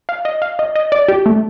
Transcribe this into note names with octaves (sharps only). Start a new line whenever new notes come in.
F5
D#5
F5
D#5
D#5
D5
G4
A3